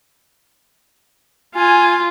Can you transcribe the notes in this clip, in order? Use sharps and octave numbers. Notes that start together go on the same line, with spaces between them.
F4 G#5